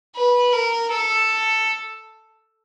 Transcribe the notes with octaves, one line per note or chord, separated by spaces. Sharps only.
B4
A#4
A4